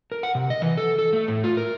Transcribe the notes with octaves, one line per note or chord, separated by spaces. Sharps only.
A#4
F#5
C3
D#5
E3
A4
A4
A3
A2
F4
A#4